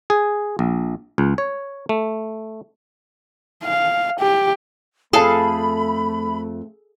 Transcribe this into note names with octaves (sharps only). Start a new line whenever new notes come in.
G#4
A#1
C#2
C#5
A3
F5
G4
F2 A3 G#4 A4 F5 A5 B5